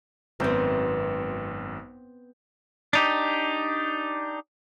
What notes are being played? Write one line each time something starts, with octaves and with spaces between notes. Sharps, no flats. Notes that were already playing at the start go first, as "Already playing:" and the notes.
G#1 F#2 B3 C4 G6
D4 D#4 G4